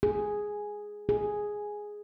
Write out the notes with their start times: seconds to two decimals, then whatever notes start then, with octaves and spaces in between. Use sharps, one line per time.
0.03 G#4
1.09 G#4